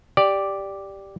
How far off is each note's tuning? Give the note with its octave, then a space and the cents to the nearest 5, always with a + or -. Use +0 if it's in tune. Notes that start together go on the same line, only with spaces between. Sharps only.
G4 +0 D5 +0